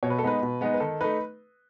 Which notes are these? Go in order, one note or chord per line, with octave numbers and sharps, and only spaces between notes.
B2 C#5
B4
A4
G#3 B3 D#4 B4
B2
G#3 B3 D#4
B4
D#3 A4
A3 D#4 B4